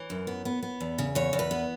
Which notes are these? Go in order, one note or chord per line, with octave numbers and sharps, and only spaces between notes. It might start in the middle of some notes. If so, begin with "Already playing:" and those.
Already playing: E3 C#5
F#2
B3
B3
B3
E2
C#3
E2 C#5
E2
B4
B3